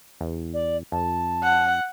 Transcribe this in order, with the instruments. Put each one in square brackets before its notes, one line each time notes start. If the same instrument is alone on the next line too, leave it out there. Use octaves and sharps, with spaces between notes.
[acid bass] E2
[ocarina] D5
[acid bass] F2 [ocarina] A5
[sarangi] F#5